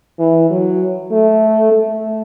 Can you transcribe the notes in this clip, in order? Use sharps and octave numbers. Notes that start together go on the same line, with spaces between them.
E3
F#3
A3
A3